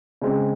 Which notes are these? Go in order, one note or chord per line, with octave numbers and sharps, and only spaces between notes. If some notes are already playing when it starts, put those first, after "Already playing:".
C#3 G#3 C4